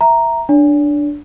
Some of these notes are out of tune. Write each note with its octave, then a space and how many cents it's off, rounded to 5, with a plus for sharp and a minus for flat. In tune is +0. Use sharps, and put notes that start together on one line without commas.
E5 +0 A#5 +0
D4 +0 C#5 +45